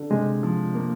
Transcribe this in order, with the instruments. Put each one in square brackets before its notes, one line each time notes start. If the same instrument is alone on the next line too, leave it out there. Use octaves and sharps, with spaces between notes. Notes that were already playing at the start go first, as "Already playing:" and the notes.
Already playing: [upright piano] D3
[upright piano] C3 [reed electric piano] G#3
[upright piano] F3
[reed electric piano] A#3